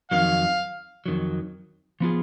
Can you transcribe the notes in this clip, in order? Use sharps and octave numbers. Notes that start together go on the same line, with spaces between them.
F2 D#3 F#3 F5
F2 D#3 F#3
F3 B3 F4 G#4